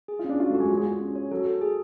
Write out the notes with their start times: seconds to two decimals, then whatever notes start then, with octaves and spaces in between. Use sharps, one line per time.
0.08 G#4
0.19 F4
0.24 C#4
0.29 D4
0.39 F4 F#4
0.50 A3 F#4
0.60 G#3
0.69 F#3 F4
0.77 G#3
0.85 F4
1.00 C#4
1.16 C#5
1.31 F#3 A4
1.46 A4
1.62 G#4